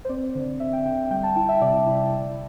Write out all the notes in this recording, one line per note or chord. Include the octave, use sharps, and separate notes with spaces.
C5
C4 D5
D3
C4 E5
G5
D3 G5
G3 G5
A5
E4 G5
E5
C3 D5
E4
E4